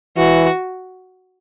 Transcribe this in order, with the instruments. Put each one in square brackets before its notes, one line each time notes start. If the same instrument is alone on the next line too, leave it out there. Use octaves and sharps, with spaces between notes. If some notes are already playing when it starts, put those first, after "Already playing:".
[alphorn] E3 [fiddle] F#4